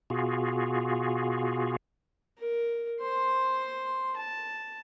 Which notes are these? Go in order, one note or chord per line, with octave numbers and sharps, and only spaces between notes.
B2 F4 F#4 G#4
A#4
C5 C6
A5